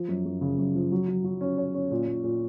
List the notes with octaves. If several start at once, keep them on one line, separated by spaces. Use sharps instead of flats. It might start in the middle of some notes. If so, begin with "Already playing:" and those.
Already playing: F3
F#2
F#2
C#3
F#2
F3
F#3
F#3
F#3
C#4
C#5
C#4
A#2
A#2
A#2